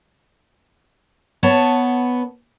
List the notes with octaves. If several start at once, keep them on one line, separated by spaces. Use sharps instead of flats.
B3 C#5 A5